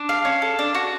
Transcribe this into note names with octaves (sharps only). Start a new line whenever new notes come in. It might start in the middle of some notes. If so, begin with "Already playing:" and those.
Already playing: D4
F5
C#4
A4
D4
F#4